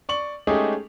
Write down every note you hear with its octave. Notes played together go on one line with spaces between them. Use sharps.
D5 C#6 F#7
G#3 A3 C#4 D#4 G4 G#4